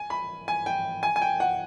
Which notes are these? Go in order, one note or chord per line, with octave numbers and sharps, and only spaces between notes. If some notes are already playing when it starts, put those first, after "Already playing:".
Already playing: G#5
B5
G#5
G5
G#5
G#5
G5
F#5